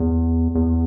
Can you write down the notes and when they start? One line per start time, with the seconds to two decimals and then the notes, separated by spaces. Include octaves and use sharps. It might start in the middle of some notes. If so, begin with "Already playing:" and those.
Already playing: E2
0.55 E2